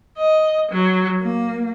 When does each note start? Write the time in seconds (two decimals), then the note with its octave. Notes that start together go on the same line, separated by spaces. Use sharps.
0.16 D#5
0.71 F#3
1.21 A#3